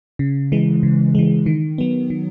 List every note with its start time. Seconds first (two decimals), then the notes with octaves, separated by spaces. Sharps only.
0.19 C#3
0.52 E3 G#3
0.83 C#3
1.15 E3 G#3
1.46 D#3
1.78 F#3 B3
2.10 D#3